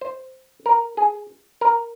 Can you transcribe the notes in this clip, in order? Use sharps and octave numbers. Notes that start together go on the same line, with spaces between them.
C5
A#4
G#4
A#4